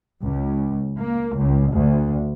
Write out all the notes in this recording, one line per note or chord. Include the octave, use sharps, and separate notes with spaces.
C#2
A#3
C#2
D2